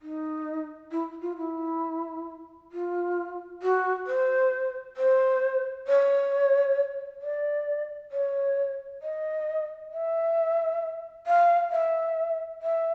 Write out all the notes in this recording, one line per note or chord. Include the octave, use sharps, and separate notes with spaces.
D#4
E4
F4
E4
F4
F#4
C5
C5
C#5
D5
C#5
D#5
E5
F5
E5
E5